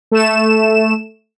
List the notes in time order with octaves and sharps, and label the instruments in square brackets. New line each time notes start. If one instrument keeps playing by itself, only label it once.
[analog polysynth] A3 E7